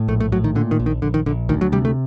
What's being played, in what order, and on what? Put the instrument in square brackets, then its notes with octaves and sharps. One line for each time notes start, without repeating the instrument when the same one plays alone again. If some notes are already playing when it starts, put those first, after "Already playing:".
Already playing: [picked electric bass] A2
A#1 A3
A3
A2 F#3
D#3
A#2 D3
D#3
A#1
D#3
A#1 D3
D#3
A#1 D3
D2 D#3
F#3
C3 G3
A3